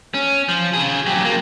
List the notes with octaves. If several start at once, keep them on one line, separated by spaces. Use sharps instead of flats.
C#4
F3
F4 G#4
F#3 G4
F3 A#3